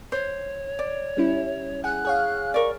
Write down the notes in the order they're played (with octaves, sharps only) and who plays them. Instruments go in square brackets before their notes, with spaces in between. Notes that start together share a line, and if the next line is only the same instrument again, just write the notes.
[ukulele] C5 [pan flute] C#5
[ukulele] D5
[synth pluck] G3 C#4 E4
[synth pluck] G#4 F#5 [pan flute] F#6
[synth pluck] G#4 C#5 F5
[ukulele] A#4 D5 [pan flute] C#6